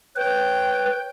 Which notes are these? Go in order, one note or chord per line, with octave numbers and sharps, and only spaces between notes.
B4 C#5 G5